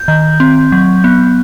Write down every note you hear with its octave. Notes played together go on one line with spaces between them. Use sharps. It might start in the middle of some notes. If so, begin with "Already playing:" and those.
Already playing: G6
D#3
C4
F#3
B3